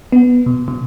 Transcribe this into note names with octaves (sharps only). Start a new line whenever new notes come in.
B3
B2
B2